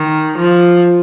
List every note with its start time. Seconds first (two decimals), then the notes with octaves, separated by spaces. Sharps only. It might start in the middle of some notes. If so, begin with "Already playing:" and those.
Already playing: D#3
0.37 F3